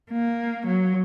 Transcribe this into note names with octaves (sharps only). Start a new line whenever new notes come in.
A#3
F#3